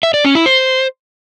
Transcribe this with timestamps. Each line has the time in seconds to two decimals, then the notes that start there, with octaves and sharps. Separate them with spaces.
0.03 E5
0.14 D5
0.24 C#4
0.35 E4
0.46 C5